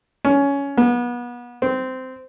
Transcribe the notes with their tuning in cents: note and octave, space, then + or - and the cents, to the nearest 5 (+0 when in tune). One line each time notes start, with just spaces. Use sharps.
C#4 +15
B3 -30
C4 -15